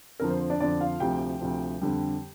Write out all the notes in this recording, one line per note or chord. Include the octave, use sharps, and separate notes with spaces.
F2 D3 F3 A#4
C5
C5
D4 D5
F2 D3 F3 D4 D5
F4 F5
D2 C3 F3 G4 G5
D2 C3 F3
F2 D3 G3